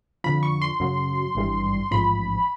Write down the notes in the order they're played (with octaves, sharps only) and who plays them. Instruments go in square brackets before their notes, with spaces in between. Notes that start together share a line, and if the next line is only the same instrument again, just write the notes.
[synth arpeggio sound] F2 D3 F3 B5
C#6
C6
F#2 C#3 F#3
G#1 G2 E3 G3
A1 G#2 F3 B5